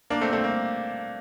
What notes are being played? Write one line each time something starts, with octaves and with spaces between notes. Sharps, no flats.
A#3 D4
A3 C4
A3 C4
A#3